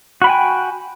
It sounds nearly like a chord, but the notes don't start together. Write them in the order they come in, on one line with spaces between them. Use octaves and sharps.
F#4 B5 G5 G#5